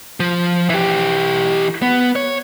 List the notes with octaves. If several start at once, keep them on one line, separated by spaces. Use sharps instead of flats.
F3
E3 G4
B3
C#5